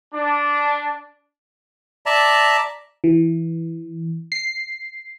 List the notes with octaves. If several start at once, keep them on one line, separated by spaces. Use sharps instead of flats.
D4
D5 E5 A5 A#5
E3
C7